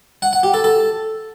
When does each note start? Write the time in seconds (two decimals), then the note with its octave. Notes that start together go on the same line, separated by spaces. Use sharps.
0.22 F#5
0.33 F#5
0.43 G4
0.54 A4
0.64 A4